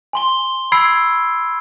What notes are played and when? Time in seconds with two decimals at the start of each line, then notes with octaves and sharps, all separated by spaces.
0.13 G#5 C6 G7
0.72 B5 E6 G#6 C7 D7